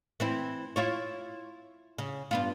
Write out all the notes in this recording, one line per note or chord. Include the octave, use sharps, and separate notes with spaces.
E3 C4 E4
E4 F4 C#5
C#3
G2 B3 F4